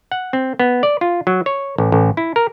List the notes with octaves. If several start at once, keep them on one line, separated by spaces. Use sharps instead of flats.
F#5
C4
B3
D5
F4
F#3
C#5
A1
A1
E4
A#4